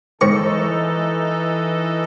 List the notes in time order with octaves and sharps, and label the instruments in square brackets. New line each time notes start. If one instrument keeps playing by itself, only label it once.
[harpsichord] G#2 D#3 C#6 [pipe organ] E3 D#4 A4